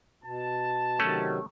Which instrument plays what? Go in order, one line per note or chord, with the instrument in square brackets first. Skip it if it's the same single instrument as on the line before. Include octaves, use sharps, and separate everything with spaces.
[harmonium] B2 [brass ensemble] A5
[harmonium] C3 D#3 F#3 [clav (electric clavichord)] A3 C#4